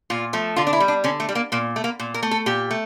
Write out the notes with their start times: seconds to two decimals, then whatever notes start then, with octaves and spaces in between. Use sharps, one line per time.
0.10 A#2 F4
0.33 F3 A3
0.56 D3 F4
0.67 D4
0.73 E4
0.80 G3
0.88 D4
1.04 D3 C#4
1.20 A3
1.29 G3
1.35 A#3
1.52 A#2 A#3
1.76 A3
1.84 A#3
1.99 A#2
2.14 A#4
2.23 A3
2.31 A4
2.46 A#2 G4
2.71 A3